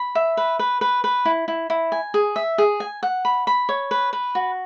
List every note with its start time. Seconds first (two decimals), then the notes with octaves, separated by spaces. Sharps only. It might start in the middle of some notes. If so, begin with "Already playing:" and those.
Already playing: B5
0.15 E5
0.37 B4
0.59 B4
0.81 B4
1.04 B4
1.25 E4
1.48 E4
1.70 E4
1.92 G#5
2.14 G#4
2.36 E5
2.58 G#4
2.80 G#5
3.03 F#5
3.25 B5
3.47 B5
3.69 C#5
3.91 B4
4.13 B4
4.35 F#4